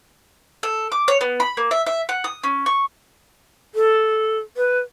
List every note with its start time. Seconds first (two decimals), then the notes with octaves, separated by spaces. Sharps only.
0.63 A4
0.92 D6
1.08 C#5
1.21 B3
1.40 B5
1.57 A#3
1.71 E5
1.86 E5
2.09 F#5
2.24 D#6
2.43 C#4
2.66 C#6
3.75 A4
4.57 B4